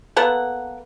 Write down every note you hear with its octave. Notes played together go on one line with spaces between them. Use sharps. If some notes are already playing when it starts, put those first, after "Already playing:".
A#3 B3 A4 F#5